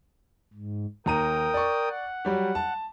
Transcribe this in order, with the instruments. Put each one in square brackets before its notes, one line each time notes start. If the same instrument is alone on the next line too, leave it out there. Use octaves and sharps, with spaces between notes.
[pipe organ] G#2
[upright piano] D#2 A#5 D#7 [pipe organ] A#4 G5 D#6
[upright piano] D5 C#6
[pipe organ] F#5
[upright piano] F#3 G3 G4
A5